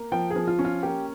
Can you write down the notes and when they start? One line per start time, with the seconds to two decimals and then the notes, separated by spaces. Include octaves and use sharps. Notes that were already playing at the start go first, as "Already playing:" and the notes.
Already playing: A#3
0.12 F3 G5
0.30 G#4
0.36 F3
0.47 F4
0.59 C#4
0.65 F4
0.83 A#3 G4